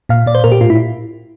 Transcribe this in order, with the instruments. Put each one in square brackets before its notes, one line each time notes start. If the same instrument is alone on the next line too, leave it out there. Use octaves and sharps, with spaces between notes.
[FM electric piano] A#2 F5
A#2 D5
C5
A#2 A#4
G4
A2 F4
E4